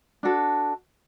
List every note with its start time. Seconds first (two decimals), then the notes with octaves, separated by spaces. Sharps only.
0.23 D4 F#4 A4